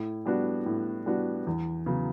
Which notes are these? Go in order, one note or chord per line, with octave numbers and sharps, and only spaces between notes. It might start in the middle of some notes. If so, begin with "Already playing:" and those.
Already playing: A2
G3 B3 D4 F#4
A2
G3 B3 D4 F#4
E2
C#3 F#3 B3